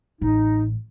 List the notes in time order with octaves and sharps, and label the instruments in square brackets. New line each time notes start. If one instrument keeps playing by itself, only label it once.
[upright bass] A1 [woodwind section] D#4